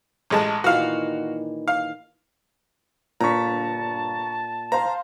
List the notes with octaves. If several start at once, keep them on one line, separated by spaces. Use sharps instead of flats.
A1 G#3 A5
A#2 D#3 E3 F#4 F5
F5
G1 A#2 D4 A5 A#5 C#6 B6
C5 F5 A#5 C6